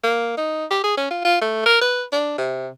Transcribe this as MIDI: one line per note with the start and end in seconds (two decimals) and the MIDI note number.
0.03 0.33 58
0.37 0.65 63
0.70 0.82 67
0.84 0.97 68
0.98 1.10 61
1.10 1.22 65
1.25 1.38 65
1.41 1.63 57
1.66 1.81 70
1.81 2.03 71
2.12 2.37 62
2.38 2.69 48